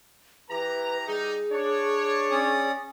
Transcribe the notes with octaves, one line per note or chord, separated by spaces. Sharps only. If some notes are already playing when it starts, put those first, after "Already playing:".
E3 G4 B4 A#5
G3 D#4 G#4
D4 C#5
C#4 D5 D#6